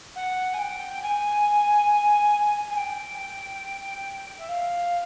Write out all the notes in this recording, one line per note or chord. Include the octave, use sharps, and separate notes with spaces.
F#5
G#5
G5
G5
G#5
G#5
G5
E5
F5